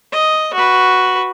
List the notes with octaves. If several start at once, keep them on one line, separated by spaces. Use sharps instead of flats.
D#5
F#4 B4